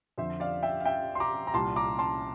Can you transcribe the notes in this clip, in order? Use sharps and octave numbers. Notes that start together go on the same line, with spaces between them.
F2 D3 F3 C5 E5
D5 F5
E5 G5
F5
E5 G5
C6
A#5 D6
A#5
C2 A#2 G3 A5 C6
A#5 D6
A5 C6